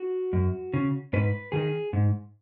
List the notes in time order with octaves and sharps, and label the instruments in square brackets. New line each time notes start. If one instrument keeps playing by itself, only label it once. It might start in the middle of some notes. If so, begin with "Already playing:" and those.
Already playing: [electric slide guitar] F#4
F#2
C#3
G#2 B4
D#3 G#4
G#2